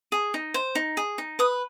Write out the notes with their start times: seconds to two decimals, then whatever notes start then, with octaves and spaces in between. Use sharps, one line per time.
0.12 G#4
0.34 D#4
0.54 C5
0.75 D#4
0.97 G#4
1.18 D#4
1.39 B4 D#6